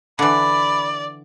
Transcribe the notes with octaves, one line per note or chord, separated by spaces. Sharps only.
D3 E3 D5 B5